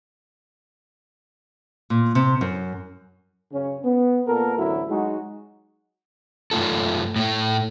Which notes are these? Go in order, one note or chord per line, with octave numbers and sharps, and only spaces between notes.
A#2
C3
F#2
F#2 C#3 C#4
B3
A#2 B3 A4 A#4
A1 D2 F#3 E4 F#4
F#3 G#3 D#4 F#4
F#2 A3 F4 A4
A2 A3